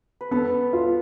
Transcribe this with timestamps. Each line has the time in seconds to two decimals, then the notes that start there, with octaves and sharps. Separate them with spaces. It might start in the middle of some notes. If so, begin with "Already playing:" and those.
0.21 B4
0.31 B3 A4
0.73 F4